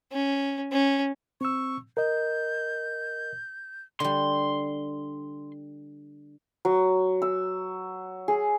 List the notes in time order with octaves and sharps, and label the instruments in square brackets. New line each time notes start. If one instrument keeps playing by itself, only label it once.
[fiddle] C#4
C#4
[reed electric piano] C4 E6 [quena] C#6
[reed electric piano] A#4 D#5 [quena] G6
[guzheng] D3 G3 [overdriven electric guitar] C6
[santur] F#3
E6
G#4